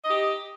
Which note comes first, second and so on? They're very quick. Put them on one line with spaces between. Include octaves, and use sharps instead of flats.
D#5 D#4 G4